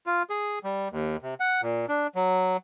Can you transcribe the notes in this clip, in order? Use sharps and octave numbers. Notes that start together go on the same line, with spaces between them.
F4
G#4
G3
D#2
C3
F#5
A#2
D4
F#3